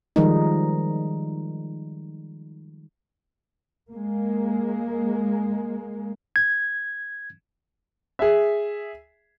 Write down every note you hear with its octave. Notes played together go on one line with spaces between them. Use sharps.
D#3 F3 G3 G#3 D#4
G#3 A#3
G#6
G#4 E5